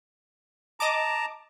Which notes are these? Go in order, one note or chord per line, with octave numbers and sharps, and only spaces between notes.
D#5 A5 A#5 D6